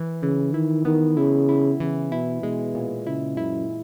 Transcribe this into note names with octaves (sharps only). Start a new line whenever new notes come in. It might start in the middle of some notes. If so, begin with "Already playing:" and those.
Already playing: E3
C#3 E3
D#3 E4
D#3 B3
C#3 E4
E4
C#3 E3
B2 E4
B2 G#3
A#2
C#3 E4
F#2 E4